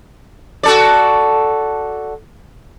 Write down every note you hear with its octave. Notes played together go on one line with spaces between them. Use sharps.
F#4 A4 D5